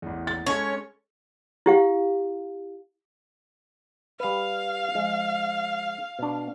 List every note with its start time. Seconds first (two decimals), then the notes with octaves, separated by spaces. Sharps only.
0.02 A1 E2
0.27 A6
0.46 G#3 C#4 A4 C#5
1.66 E4 G4 F5
4.20 G3 B4 F5
4.95 F3 G#3
6.19 B2 D4